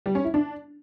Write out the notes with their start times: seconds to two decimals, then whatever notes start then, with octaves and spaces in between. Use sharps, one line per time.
0.06 G3
0.15 C#4
0.24 E4
0.34 D4